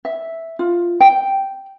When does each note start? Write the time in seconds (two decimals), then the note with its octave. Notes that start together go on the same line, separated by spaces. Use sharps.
0.05 E5
0.59 F4
1.00 G5